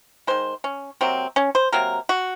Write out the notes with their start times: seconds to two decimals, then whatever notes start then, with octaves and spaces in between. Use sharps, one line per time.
0.27 D#3 G#3 C5
0.64 C#4
1.01 C3 F#3 A#3 C4
1.36 C#4
1.55 C5
1.72 C3 F#3 A#3 A#4
2.09 F#4